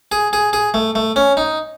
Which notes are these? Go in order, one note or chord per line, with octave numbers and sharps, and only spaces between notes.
G#4
G#4
G#4
A3
A3
C#4
D#4